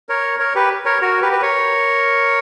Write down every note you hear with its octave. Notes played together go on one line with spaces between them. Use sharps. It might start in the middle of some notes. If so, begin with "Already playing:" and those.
A#4 C#5
A#4 C#5
G4 B4
A#4 C#5
F#4 A#4
G4 B4
B4
A#4 C#5